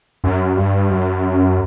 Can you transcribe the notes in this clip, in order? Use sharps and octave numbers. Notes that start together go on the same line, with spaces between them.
F#2
G2
F#2